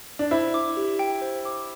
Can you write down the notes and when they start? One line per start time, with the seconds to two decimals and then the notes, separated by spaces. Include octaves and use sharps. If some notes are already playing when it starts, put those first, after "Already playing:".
0.19 D4
0.31 E4 C5
0.54 D6
0.77 G4
0.99 G5
1.21 C5
1.45 D6